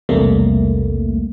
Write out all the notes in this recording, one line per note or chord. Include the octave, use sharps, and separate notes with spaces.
B1 E2 C3 G3 A3 A#3